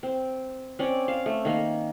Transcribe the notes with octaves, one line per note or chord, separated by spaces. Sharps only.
C4
C4 C#4 D5
F5
A3
D#3 A#3